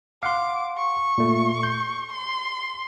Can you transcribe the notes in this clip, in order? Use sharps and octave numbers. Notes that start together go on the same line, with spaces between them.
F5 F#5 C6 D6
C#6
A#2 A3
G6
C6